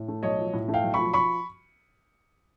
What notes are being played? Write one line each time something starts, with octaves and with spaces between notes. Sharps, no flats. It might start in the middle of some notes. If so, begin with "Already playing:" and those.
Already playing: A2
A3
B1 C#5 D#5
F3
A2
A3
F5 G5
B1
F3 B5 C#6
B5 C#6